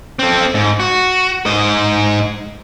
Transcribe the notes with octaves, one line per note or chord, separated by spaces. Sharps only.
C4 A4
G#2
F#4
G#2 D#5